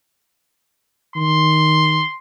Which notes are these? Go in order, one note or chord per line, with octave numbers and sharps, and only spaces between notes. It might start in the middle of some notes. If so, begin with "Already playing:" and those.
D#3 C6